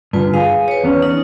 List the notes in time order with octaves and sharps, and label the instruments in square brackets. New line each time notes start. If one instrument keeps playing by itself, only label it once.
[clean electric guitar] G2 D3 [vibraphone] F4 B4
[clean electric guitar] G#4 [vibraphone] F5
[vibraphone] B4 C#5
[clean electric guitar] E2 B3 C#4
[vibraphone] D#4